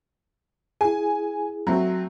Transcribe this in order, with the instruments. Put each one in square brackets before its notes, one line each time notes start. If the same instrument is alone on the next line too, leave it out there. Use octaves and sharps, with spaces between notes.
[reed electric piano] E4 G#4 [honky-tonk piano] G#5
[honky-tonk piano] F#3 A3 C4